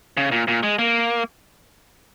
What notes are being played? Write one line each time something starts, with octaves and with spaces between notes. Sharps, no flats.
C#3
A#2
A#2
G#3
A#3